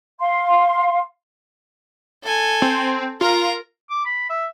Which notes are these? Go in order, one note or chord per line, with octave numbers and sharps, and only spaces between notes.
F5 C6
A4 G#5
C4
F4 A#4 A#5
D6
B5
E5